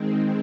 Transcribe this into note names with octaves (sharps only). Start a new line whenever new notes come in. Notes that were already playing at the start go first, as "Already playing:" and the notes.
Already playing: D#3 G#3 C4